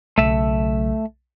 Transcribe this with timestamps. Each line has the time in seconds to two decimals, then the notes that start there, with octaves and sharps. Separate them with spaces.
0.18 B1 C#3 F#3 A3 E5